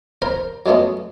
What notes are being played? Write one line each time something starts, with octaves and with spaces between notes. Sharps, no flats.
A#4 C5 A#5 B5
F#3 G#3 A3 B3 C#4